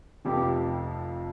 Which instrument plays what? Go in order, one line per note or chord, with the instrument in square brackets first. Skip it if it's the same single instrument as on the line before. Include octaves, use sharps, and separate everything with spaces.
[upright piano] F1 F2 F3 [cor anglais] G4